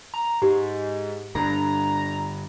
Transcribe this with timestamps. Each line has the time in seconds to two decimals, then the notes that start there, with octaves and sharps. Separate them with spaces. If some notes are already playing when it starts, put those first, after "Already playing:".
0.14 A#5
0.42 G#2 G4
1.35 G2 D3 A#5